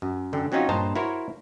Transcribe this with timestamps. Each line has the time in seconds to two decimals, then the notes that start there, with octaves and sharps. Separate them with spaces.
0.02 F#2
0.33 F#2 D3 G5
0.52 F#3 C4 C#4 D#4 F4 F#4
0.69 G2 A#2 C5 D#5 A5 A#5
0.96 E4 F#4 A#4 C5 C#5